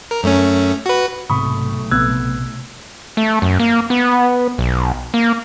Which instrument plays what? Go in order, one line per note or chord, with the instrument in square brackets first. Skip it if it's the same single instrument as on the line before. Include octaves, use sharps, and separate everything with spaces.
[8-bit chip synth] A#4
F#2 A3 C#4
F#4 B4
[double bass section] B1 A3 [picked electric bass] G#2 C3 [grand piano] B5 C#6 [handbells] D#6
[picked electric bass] A#1 C3 [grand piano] B3 [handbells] E6 F#6 G#6
[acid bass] A3
F#2
A#3
B3
B1
A#3